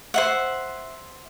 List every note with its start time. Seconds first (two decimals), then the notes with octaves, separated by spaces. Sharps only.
0.14 C5 E5 F#5